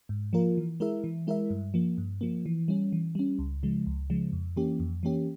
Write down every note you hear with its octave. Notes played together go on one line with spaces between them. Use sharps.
G#2
F3 A#3 F4 A#4
E3
G#3 E4 A#4 E5
E3
G#3 E4 A#4 E5
G2
F3 A#3
G2
F3 A#3
E3
G3 C#4
E3
G3 C#4
C#2
C#3 F3 G#3
C#2
C#3 F3 G#3
F2
E3 A#3 C#4 G4
F2
E3 A#3 C#4 G4